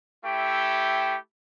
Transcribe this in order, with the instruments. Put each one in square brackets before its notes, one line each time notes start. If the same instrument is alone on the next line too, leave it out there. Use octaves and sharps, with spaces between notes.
[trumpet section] A3 E4 G4 G5